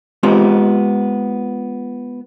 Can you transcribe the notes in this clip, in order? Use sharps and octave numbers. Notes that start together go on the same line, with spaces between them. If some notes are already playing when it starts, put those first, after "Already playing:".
G#3 B3 C4 F4 G4